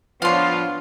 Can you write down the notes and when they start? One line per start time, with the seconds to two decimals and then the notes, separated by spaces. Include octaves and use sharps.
0.22 F3 B3 D4 F4 C#5 F5 C6